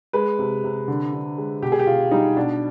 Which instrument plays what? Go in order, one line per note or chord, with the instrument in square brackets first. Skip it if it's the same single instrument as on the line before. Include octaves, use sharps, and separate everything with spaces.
[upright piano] G#3 B4
C3
C3
D3
D3
G#3
B2 G4
G#4
G4
B2 F4
G3 D#4
B2 D4